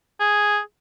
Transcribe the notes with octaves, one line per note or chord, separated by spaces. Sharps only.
G#4